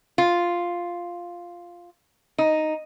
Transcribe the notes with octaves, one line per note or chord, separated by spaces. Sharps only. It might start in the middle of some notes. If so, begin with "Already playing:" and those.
F4
D#4